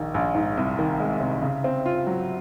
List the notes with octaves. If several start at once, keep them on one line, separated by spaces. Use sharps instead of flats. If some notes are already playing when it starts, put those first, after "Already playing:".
Already playing: A#1 D#3
A#1
G#2
C2
D#3
G#3
C3
C#3
C4
F4
F#3